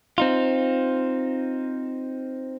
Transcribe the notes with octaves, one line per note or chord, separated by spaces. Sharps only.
C4 D#4 F4